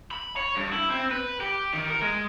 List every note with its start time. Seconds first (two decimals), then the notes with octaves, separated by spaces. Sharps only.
0.11 B5
0.36 C#5
0.56 G2
0.72 E4
0.90 C4
1.11 B4
1.41 G4
1.74 D#3
1.90 A#4
2.02 G#3